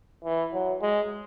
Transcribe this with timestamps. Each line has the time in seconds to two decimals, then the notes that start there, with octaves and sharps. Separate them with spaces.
0.24 E3
0.53 F#3
0.82 G#3